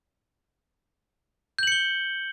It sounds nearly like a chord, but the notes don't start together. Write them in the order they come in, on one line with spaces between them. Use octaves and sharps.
G6 F#7 C#7 G7